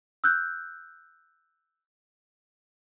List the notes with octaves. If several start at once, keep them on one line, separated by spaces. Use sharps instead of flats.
E6 F#6 G6